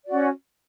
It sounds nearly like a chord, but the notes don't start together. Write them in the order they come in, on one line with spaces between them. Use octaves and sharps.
D5 F#4 C#4